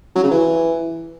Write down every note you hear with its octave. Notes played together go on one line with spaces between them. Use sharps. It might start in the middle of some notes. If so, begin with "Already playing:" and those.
F#3
C#3
E3